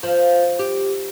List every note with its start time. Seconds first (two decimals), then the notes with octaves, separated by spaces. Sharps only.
0.03 F3
0.59 G4